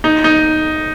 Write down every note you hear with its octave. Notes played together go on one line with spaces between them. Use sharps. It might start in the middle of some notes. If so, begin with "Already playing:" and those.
D#4
D#4